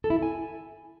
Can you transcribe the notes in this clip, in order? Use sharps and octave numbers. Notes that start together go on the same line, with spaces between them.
A4
E4
A4
G#5